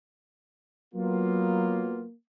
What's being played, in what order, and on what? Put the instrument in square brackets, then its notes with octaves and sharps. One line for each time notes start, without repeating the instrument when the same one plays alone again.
[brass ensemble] F#3 B3 F4 [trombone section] A#3